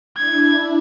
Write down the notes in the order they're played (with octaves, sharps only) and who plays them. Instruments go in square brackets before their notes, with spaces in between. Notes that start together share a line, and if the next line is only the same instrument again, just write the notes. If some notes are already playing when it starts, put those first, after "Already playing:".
[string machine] D4 E4 [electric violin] G#6